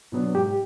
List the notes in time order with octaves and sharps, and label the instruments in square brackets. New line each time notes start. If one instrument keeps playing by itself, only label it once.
[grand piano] B2 F#3 B3 D4
[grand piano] G#2 [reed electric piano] G4